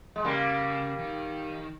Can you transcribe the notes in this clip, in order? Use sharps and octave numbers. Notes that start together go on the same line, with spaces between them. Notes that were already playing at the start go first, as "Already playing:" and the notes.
G#3
C#3 G3 A#3
D#3